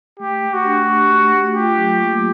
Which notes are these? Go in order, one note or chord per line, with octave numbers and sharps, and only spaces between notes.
A3 G4
A3
F#4
D4
G4
A3
A3
F4 G4
F#3
A#3